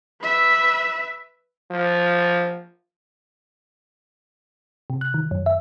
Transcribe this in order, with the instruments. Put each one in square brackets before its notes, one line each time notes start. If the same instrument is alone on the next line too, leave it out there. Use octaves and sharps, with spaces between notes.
[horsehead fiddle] B4 E5
[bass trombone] F3
[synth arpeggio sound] C3
F#6
D#3
F#2
E5